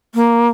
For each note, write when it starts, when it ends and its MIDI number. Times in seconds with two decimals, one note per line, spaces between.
0.15 0.48 58